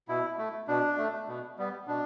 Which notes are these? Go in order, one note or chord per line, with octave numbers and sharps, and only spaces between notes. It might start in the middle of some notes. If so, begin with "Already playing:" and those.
B2 E4
A3
B2 D4
A3
B2
G3 B3
B2 D4